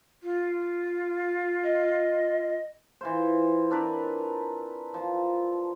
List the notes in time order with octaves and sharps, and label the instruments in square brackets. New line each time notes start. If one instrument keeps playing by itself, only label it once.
[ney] F4
[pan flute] D#5
[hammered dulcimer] E3 F4 C5
C4 D4 A#4 B4
F3